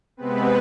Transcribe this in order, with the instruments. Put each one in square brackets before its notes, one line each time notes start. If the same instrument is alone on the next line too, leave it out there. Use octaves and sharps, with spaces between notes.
[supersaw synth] C3 G#3 B3 C4 B4